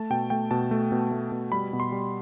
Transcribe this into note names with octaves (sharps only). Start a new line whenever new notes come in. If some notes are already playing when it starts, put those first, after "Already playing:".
Already playing: A3 A5
B2 G5
A3 G5
B2 A5
A3
B2
A3
B2
G3 B5
B2
C6
G3